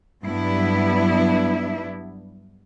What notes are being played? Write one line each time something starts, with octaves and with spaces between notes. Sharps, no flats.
G2 F#3 B3 D4 E4